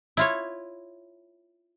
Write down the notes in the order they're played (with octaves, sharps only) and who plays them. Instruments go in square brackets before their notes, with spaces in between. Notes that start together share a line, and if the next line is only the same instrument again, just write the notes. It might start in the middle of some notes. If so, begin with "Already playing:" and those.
[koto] E4 F4 C#5